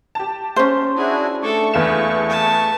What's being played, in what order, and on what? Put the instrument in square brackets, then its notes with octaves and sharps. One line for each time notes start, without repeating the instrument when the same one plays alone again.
[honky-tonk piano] G4 A5
[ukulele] C#4 C5
[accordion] D4 E4 F#4 [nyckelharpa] G#4
[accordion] A3 C#6 [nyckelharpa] D4 A4
[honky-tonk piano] E2 F5 E7 [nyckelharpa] B4
[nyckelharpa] B4 A5